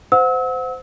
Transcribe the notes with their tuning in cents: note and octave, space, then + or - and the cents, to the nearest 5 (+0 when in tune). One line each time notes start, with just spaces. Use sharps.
C5 -25 F#5 -25 E6 -35